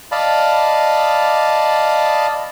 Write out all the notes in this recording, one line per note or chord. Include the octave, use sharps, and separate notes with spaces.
D5 D#5 F5 A5 B5